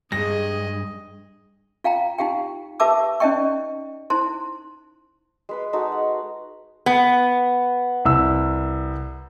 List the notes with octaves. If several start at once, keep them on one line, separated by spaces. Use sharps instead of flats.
G2 G#3 G#4 D#5 A#6
F4 F5 G5 A#5
D#4 F4 G4 F5 G5
G4 B4 E5 A5 D6 E6
C#4 D#4 D5 D#5 G5 C#6
D#4 E4 C5 C6
G#3 B4 C6
G#3 D#4 F#4 A4
F#5
B3
C2 E6